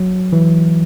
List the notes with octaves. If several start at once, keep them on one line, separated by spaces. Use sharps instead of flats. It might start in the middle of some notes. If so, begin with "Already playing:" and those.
Already playing: F#3
E3